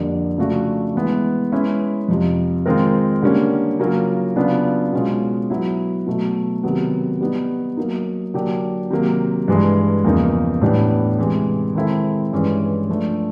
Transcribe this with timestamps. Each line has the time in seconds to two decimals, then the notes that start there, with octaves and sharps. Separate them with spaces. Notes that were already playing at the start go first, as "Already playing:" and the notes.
Already playing: F2 D3 G3 A#3 D4
0.38 C#3 F3 A3 D4 F#4
0.95 E3 G#3 B3 E4
1.52 G#3 C#4 E4 G#4 B4
2.08 F2 C3 F3
2.66 D#3 G#3 C4 F4 A#4
3.22 D3 G3 A#3 C#4
3.79 C#3 F#3 A#3 C#4 F4
4.36 C#3 F#3 B3 D4 F4
4.93 B2 G#3 C#4 F4
5.50 F#3 B3 E4
6.07 B2 F#3 A3
6.63 C3 D#3 F#3 B3
7.21 G3 B3 D#4
7.77 F#3 A#3 D#4
8.34 D3 F#3 A#3 D4 G4
8.90 C3 D#3 F#3 A#3
9.48 G2 E3 G#3
10.04 E2 C#3 F3 A#3 D#4
10.61 A2 E3 G3 B3 D4
11.18 C3 E3 G#3
11.75 D#3 G#3 C4 E4 A4
12.32 G2 E3 G#3 C#4
12.89 F3 A3 D4